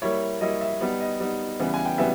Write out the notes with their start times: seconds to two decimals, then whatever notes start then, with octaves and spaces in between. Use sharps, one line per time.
0.02 G3 A#3 E4 C#5
0.41 G3 A#3 E4 D#5
0.61 E5
0.81 G3 B3 D#4
1.00 D#5
1.20 G3 B3 D#4
1.60 C#3 E3 G3 B3
1.74 G#5
1.85 G5
1.98 C#3 E3 G3 B3 E5